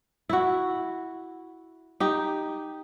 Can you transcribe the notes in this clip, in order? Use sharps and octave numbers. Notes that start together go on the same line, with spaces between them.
E4 F#4
D#4 G4